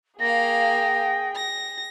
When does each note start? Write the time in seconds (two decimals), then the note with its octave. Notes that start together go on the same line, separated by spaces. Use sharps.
0.20 A#3 G#4 F5 G5 A#6
1.36 A#6